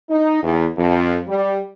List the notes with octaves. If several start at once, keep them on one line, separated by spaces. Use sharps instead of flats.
D#4
E2
F2
G3